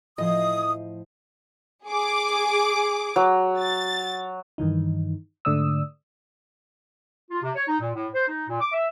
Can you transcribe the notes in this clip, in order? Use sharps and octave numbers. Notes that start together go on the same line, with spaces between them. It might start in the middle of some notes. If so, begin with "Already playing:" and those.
A2 F3 C5 D#5 D#6
G#4 D6
F#3
A6
G2 D#3 E3 D#4
G#2 D3 A3 D5 D#6 E6
F4
C3
C#5
D#4
A#2
A2
C5
D#4
A#2
D6
E5